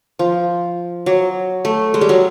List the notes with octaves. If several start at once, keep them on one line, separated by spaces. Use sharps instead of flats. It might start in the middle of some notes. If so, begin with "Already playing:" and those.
F3
F#3
A3
G#3
G3
F#3